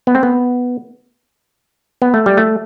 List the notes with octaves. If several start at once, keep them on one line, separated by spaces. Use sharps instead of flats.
B3
C4
B3
B3
A3
G3
A3